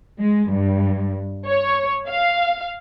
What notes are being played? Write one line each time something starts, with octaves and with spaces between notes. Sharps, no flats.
G#3
G2
C#5
F5